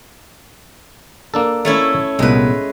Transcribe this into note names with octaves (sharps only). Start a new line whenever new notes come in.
A#3 D4 A4
A3 C#4 E4
C2 A#2 G#3 B3 B4